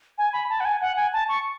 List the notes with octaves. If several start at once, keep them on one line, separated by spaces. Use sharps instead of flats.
G#5
B5
A5
F#5
G#5
F#5
G#5
A5
C#6